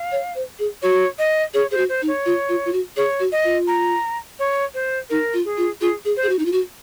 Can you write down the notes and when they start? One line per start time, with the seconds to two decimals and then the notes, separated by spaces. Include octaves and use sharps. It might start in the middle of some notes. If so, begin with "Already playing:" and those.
Already playing: F5
0.12 C#5
0.35 C5
0.59 G#4
0.82 F#4 C#5
1.19 D#5
1.54 G#4 C#5
1.71 G#4 C5
1.77 F#4
1.89 C5
2.02 D#4
2.08 C#5
2.26 F4
2.49 F4
2.65 F4
2.73 F#4
2.96 G#4 C#5
3.20 F#4
3.32 D#5
3.44 F4
3.68 A#5
4.39 C#5
4.74 C5
5.10 D#4 A#4
5.33 F4
5.45 G#4
5.57 F4
5.81 F4 G#4
6.05 G#4
6.17 C5
6.23 G#4
6.29 F#4
6.39 D#4
6.45 F4
6.52 F#4